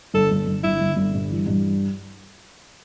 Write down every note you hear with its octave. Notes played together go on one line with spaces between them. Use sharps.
G1 A4
G1
G1
G1 E4
G1
G1
G2
E3
G2